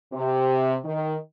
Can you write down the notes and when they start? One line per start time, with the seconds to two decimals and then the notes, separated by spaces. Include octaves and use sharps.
0.13 C3
0.84 D#3